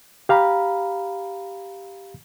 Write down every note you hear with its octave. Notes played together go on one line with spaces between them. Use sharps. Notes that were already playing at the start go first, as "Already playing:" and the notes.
G4 F5 A#5 B5